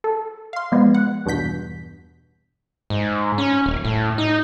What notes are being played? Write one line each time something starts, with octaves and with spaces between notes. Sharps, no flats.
A4
F5 C6
B2 F3 G#3 B3
F#5
E2 G2 B2 G6 B6
G#2
C#4
D#1
A2
D#4